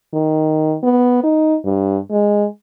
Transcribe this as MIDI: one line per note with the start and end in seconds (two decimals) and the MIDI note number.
0.13 0.75 51
0.83 1.20 59
1.24 1.57 63
1.64 1.98 43
2.11 2.46 56